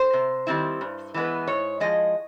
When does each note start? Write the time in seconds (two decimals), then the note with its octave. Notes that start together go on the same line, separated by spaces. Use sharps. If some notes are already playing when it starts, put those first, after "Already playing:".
Already playing: C5
0.13 C3
0.47 D#3 G3 C4 E4
0.81 G2
1.14 E3 G#3 B3
1.47 G#2 C#5
1.80 F3 G#3 D#5